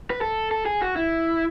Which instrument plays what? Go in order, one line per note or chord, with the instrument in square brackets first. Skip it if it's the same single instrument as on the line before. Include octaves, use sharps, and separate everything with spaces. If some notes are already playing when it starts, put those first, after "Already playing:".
[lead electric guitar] B4
A4
A4
G#4
F#4
E4